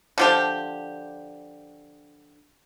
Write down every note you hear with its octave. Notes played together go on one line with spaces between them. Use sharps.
D3 F3 G4